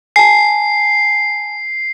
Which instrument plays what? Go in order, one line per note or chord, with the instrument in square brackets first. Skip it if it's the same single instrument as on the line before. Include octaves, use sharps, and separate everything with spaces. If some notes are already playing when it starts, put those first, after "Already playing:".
[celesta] G#5 A5 [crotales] C7